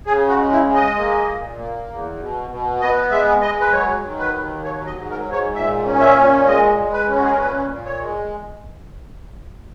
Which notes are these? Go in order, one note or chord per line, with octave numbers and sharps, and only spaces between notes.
C#3 G#4
F#4
G#3
E4
G#3
D#5
A#3
A#2
A#3
E2
B2
B2
B3 D#5
G#3 E5
G#3 D#5
B4
F#3 C#5
D#3
B4
D#2
F#3 C#5
D#5
G#2
A#4
G#2
C#5
A#2 E5
C#4
E5
A#2
G#3 D#5
G#3
B4
C#4
F#4
G#4
A#4
A#2 B4
A#2
C#5
G#3